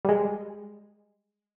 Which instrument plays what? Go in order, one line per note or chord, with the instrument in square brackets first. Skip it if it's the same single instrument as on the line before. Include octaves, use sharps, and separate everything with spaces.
[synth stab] G3 G#3